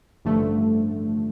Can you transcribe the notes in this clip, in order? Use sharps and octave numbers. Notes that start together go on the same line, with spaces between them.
A1 G2 D3 F3 A3